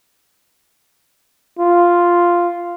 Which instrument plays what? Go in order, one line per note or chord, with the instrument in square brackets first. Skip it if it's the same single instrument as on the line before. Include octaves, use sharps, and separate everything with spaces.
[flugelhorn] F4